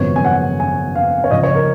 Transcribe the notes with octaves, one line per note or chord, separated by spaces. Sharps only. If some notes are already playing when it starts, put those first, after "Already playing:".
Already playing: G#1 F#2 C#3 F3 B3 C#5
G#5
F#5
G#5
F5
C#5
C#2 C#3 F3 D#5
C#5
A#4